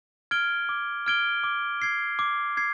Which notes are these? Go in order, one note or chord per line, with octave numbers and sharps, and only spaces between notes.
F6 G#6 D7 G7
D6
F6 G#6 D7 G7
D6
G#6 C7
D6
G#6 C7